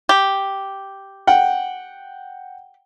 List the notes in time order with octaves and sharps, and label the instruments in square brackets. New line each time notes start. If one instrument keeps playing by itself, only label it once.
[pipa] G4
[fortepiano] F#5 G5